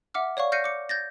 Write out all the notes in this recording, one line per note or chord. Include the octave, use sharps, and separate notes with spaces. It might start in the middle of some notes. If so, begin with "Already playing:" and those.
E5 F#5 D6 F6
C#5 D5 F5 C#6
F6 G6 A#6 C7 C#7 D#7
D6 C#7
G6 A6 A#6